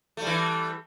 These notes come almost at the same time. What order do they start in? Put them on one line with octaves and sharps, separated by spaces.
A3 G3 E3